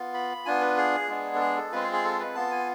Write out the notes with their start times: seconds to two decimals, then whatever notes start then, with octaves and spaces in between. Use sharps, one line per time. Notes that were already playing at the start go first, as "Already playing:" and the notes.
Already playing: B3 F4
0.14 B5
0.45 B3 D4 F4 G#5
0.61 B4
0.77 G#4
1.09 G#3 B3 D4
1.35 A4
1.40 G#4
1.56 A4
1.72 G#3 C4 F4 B4
1.82 G#4
1.93 G#4
2.04 A4
2.19 B4
2.35 B3 F4 A5
2.51 G#5